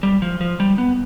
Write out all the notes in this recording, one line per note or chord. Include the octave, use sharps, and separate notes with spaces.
G3
F3
F3
G3
B3